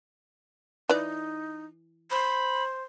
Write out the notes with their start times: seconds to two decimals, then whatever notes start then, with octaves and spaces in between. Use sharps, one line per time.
0.89 E3 D#4 D5
2.11 C5 B5